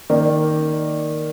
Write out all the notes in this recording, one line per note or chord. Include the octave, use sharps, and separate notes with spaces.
D#3 A#3 D#4 A#4 D5